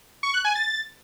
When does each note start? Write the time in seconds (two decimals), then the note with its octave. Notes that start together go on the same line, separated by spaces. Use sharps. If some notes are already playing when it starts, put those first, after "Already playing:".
0.23 C#6
0.34 F#6
0.45 G#5
0.55 A6